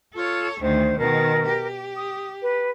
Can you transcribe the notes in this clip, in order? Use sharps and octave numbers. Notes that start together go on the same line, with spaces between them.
F4 A4 C#5
D2 D#3 C5
B2 D#3 A#4
G4
D#6
B4